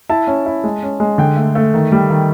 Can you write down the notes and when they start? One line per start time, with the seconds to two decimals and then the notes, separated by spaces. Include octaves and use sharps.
0.09 E4 A5
0.27 C#4
0.46 E4
0.64 G#3
0.83 C#4
1.00 G#3
1.18 D3 G5
1.37 A3
1.55 A3
1.74 D#3
1.92 G3
2.10 D#3